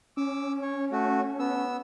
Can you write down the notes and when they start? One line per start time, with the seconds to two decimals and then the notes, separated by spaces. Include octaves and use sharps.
0.17 C#4 D6 E6
0.62 C#5
0.92 A3 F#4
1.39 B3 E6